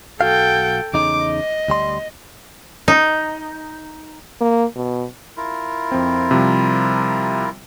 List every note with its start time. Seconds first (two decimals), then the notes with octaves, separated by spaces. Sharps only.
0.21 B1 F#4 A4 F5 G5
0.94 E2 C#3 D#4 D6
1.26 D#5
1.68 D2 G3 C6
2.88 D#4
4.40 A#3
4.76 B2
5.37 E4 F4 A#4
5.92 F2 C4
6.31 C3 F3 G3